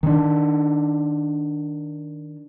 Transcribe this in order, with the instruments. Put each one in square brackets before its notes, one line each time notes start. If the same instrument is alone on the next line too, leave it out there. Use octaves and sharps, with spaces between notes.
[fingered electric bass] D#3 D4